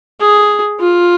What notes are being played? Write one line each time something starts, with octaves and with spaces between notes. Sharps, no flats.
G#4
F4